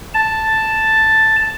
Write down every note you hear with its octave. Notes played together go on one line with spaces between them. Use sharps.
A5